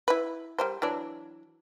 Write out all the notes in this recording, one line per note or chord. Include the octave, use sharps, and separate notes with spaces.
E4 B4
G3 A#4 C5
E3 F#3 D4